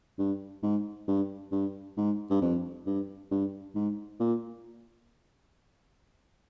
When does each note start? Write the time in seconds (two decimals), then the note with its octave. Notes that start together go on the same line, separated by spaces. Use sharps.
0.19 G2
0.63 G#2
1.08 G2
1.52 G2
1.97 G#2
2.30 G2
2.42 F2
2.86 G2
3.31 G2
3.75 G#2
4.20 A#2